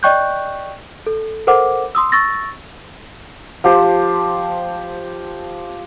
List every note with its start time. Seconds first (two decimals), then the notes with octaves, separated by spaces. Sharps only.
0.03 D5 D#5 G5 C#6 F#6 G6
1.07 A4
1.47 A4 A#4 C5 F#5 D6
1.95 C6 D#6 E6
2.12 C#6 E6 A6 A#6
3.64 F3 G4 C5